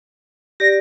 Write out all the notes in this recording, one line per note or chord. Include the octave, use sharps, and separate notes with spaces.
G4 D5 A#6